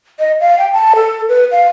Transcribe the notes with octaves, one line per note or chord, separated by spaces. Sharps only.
D#5
F5
G5
A5
A4
B4
F5